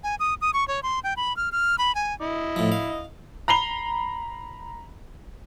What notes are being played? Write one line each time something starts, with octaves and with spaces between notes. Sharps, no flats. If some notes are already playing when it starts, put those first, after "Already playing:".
G#5
D#6
D#6
C#6
C#5
C6
G5
B5
F6
F6
B5
G#5
E4 D#5
A2 F3
F5
A#5 B5 C7 F7 G7